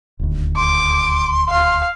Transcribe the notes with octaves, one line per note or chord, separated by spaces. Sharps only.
D#1 D2
C6 D6
F5